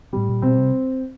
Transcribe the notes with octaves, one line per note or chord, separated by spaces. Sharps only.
A2 G3
A#2
B2 C4
C3